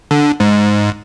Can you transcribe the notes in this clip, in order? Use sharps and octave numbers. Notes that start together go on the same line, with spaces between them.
D3
G#2